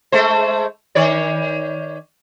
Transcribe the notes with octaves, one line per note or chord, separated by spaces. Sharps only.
G#3 A3 C5
D#3 C#5 D5